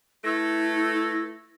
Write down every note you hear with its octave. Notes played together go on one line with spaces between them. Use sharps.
A3 E4 B4 E6 G#6 A#6